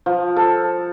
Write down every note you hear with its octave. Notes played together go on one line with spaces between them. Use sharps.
F3
A4